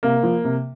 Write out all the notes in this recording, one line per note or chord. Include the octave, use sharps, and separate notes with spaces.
C3 A#3
F3
C3